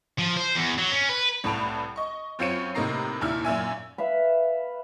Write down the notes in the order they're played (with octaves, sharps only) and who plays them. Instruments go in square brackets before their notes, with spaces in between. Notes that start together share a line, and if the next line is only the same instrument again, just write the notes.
[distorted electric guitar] F3
C5
E2
F#3
C#4
B4
[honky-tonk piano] C2 A2 B4 A5 D7 F7
D#5 C#6
F#2 C4 F4 C#5 C#7 D#7
A2 C3 A#3 D#4 A#5 C7
D#2 A#2 E4 F6
F#2 A#2 E5 G#5
[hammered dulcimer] B4 E5 F5 B5